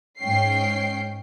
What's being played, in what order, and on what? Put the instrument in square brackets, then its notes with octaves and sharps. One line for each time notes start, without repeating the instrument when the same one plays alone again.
[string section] G#2 C#4 G5 C7